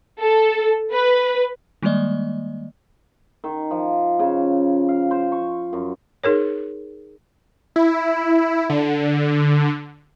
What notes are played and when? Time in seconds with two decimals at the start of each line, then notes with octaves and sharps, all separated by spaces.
0.20 A4
0.93 B4
1.82 D#3 G3 G#3 A#3 D5 D#5
3.44 D#3
3.71 F3
4.19 C#3
4.89 F5
5.11 C5
5.32 C#6
5.73 F#2
6.24 D#4 G#4 A#4 C#5
7.76 E4
8.70 D3